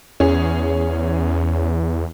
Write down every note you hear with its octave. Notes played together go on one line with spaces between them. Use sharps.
E2 C#4 G#4